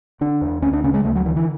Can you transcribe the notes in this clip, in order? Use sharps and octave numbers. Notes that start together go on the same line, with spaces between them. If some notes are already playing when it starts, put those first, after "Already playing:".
D3 D4
E2
D2 C#4
D4
C#3 C#4
G#3
D2 A3
F#3
D3 E3
E3